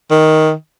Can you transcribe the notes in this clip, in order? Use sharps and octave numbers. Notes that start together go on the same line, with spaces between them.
D#3